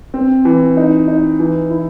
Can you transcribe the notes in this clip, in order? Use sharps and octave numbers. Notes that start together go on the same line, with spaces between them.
C4
E3
D#4
D#4
E3
E4